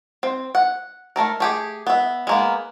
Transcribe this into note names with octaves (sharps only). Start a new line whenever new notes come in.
C4
F#5
A3 B3 A4 A#4
A3 G4 G#4
B3 E5
G#3 A#3 B3